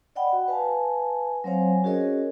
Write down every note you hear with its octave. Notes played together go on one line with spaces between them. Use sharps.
D5 D#5 F#5 G5 B5
F#4
B4 F5 G#5 A5
F#3 C4 C5 C#5 F5 G#5
C#4 F#4 G#4 A#4 C#5 D#5